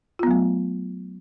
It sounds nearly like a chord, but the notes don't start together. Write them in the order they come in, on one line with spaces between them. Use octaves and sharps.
F4 B3 F#3 A3